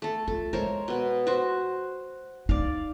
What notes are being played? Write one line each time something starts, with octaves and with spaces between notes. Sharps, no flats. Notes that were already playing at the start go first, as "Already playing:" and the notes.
A3 A4
F4 A4
G#3 A#4 C5 C#5
B2 B3
F#4 C5
D#4 D5 F5